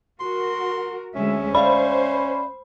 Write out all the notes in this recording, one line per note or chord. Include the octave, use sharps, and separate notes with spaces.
F#4 A#4 C6
D2 G#3 C#4 E5
C5 D5 E5 F5 B5